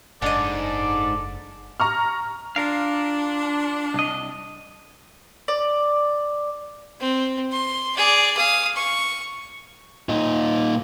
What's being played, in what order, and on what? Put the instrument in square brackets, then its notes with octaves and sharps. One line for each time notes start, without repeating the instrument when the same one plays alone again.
[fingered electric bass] F#1 [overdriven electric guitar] G#2 [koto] D4 D#5 [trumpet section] A4 D5
[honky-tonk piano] A#5 C#6 F6
[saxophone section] D4 [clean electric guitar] F4 A#4 F5
[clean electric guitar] C2 D#5
[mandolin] D5
[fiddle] C4
C6
G#4 D5
F5 D#6
C#6
[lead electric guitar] A#2 D#4